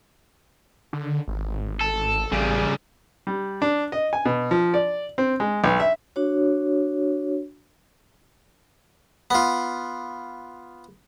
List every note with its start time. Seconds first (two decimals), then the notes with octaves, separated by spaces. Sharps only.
0.93 D3
1.28 G#1
1.81 A4
2.32 A1 C#3 G3
3.27 G3
3.62 D4
3.92 D#5
4.13 G#5
4.25 B2
4.51 F3
4.74 D5
5.18 C4
5.40 G#3
5.64 B1
5.80 E5
6.16 D4 F#4 C#5
9.31 B3 F4